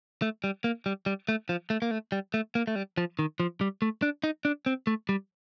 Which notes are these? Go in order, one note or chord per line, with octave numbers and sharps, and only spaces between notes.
A3
G3
A#3
G3
G3
A3
F3
A3
A#3
A3
G3
A3
A#3
A3
G3
F3
D#3
F3
G3
A3
D4
D#4
D4
C4
A3
G3